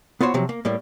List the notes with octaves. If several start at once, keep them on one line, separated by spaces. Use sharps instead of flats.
B3 F4 F#4 C5 C#5
C3 F3 F#3
A#3
A2 G3 A#3